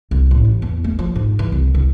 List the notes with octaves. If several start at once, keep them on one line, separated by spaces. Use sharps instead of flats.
C2
A1
E3
E2
A3
F3
G#2
E3
C2
C2